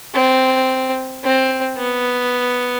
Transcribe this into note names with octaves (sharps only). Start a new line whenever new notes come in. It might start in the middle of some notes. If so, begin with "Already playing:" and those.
C4
C4
B3